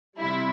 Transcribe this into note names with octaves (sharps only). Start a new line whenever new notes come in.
C3 G3 E4